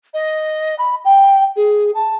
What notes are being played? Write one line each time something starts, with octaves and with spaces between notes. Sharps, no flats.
D#5
B5
G5
G#4
A5